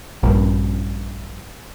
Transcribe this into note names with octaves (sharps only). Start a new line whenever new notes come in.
A#1 G2